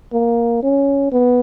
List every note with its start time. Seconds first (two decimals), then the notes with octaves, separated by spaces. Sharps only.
0.13 A#3
0.63 C#4
1.12 B3